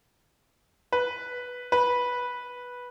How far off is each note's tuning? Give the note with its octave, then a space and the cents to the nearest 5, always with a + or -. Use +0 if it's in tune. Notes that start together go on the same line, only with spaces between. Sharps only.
B4 -5
B4 -10